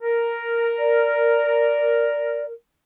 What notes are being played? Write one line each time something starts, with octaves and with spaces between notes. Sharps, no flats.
A#4
D5